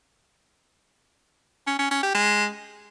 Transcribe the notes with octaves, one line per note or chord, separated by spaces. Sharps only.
C#4
C#4
C#4
G4
G#3